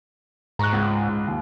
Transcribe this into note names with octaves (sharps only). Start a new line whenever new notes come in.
G#2 A#5 C#6 F#6
C#2
D#2